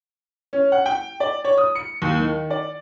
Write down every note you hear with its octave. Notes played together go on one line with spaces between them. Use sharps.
C#4
F#5
G5
D5
C#5
D#6
C#7
D#2
D#3
D5